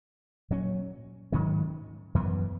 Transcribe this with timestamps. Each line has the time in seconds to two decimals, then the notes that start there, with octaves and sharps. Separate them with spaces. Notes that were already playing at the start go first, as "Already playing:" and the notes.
0.50 A#2 F#3 C#4
1.32 G#2 D#3 F#3 C#4
2.15 F#2 E3 B3